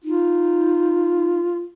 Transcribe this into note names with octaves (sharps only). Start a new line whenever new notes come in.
D#4 F4